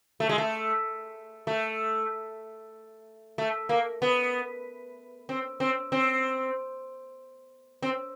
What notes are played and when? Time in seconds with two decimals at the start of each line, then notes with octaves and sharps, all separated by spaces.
0.20 A3
0.29 G#3
0.38 A3
1.47 A3
3.38 A3
3.69 A#3
4.02 B3
5.29 C4
5.60 C4
5.92 C4
7.82 C4